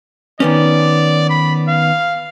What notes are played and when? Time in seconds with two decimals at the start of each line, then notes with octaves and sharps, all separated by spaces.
0.40 D#3 B3 C#4 D5
1.30 B5
1.69 F5